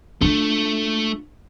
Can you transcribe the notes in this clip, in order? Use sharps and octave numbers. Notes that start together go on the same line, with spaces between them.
A3 D4 F4